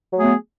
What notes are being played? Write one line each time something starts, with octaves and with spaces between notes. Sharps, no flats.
F#3 A3 B3 G#4